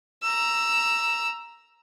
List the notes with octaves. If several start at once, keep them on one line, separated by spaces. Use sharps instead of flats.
A#5 E6